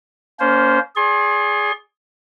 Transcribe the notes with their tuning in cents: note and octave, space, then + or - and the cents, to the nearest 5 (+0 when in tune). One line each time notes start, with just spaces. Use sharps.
A#3 +0 C#4 +30 C5 -10
G#4 +0 D5 -25 C6 +35